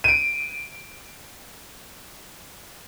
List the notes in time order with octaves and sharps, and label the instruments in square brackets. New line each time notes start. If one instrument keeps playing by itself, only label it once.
[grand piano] D7 D#7